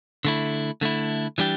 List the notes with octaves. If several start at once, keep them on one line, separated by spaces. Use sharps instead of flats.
D3 A3 E4
D3 A3 E4
E3 G3 D4 G4